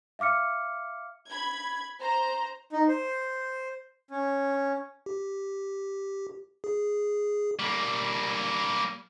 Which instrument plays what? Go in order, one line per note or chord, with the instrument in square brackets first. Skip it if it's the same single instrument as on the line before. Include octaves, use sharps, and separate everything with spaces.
[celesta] E5 F5 D6 F6 C#7
[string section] B5 G#6
C5 A#5
[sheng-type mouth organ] D#4
C5
C#4
[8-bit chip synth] G4
G#4
[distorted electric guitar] G3 A#3